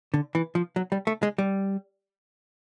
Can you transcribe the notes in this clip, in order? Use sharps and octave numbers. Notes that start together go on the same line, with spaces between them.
D3
E3
F3
F#3
G3
A3
G#3
G3